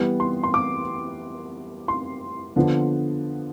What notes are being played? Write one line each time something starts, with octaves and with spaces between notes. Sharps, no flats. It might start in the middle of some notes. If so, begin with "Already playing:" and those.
Already playing: E3 G3 B3
C6
C6
D6
C6
D3 F3 B3